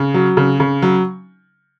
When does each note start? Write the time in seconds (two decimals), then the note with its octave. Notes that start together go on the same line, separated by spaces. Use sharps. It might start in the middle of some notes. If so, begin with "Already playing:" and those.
Already playing: C#3
0.14 F#3
0.37 C#3
0.60 C#3
0.82 F#3